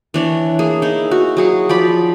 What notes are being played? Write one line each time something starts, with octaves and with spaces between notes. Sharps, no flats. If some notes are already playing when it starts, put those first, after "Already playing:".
E3 D4 C#5
A#3 G#4
D#4 E4
F#4
F#3 G#4 C#6
F3 D5 B5